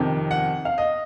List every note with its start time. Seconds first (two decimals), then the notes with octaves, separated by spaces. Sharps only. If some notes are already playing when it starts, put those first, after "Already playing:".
Already playing: F2 C3 D#3
0.31 F#5
0.65 F5
0.78 D#5